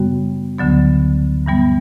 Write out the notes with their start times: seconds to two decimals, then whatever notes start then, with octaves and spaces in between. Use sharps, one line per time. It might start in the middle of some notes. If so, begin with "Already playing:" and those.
Already playing: F#2 C#3 G3 B3 F#4
0.58 D2 D3 F#3 B3
1.46 G2 E3 G3 B3